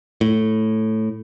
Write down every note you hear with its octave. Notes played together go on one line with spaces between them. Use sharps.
A2